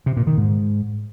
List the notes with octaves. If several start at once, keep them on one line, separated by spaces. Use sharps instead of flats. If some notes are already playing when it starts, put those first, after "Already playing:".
C3
A#2
D#3
G#2